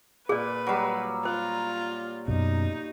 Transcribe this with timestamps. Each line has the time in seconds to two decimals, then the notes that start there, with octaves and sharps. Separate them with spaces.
0.29 A#2 G#4 B4 D5
0.67 F#3 G3
1.25 F4 C5
2.28 F#2 B2 D#4